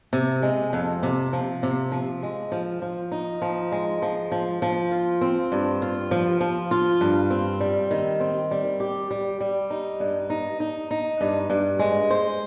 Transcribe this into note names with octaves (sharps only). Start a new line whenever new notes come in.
C3
G#3
F2
C3
F3
C3
F3
G#3
F3
F3
D#4
F3
G#3
F3
F3
F3
F4
C4
G2
F4
F3
F3
F4
G2
C4
G3
D#3
C4
G3
G4
G3
G3
D#4
G2
D#4
D#4
D#4
G2
G2
G#3
C5